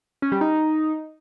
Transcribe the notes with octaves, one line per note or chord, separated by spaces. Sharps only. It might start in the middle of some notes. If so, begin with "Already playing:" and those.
C#4
G3
D#4